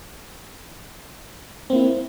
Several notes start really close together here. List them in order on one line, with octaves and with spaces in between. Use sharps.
C4 A#3 E4